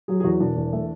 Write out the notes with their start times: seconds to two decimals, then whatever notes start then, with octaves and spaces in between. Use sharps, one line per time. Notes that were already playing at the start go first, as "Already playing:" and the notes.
0.08 F#3 G#4
0.20 G#4
0.24 E2 F#4
0.40 E1 D4
0.56 E2
0.73 A3